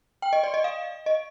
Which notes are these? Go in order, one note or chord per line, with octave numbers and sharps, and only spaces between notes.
G5
D#5
D5
D#5
F5
D#5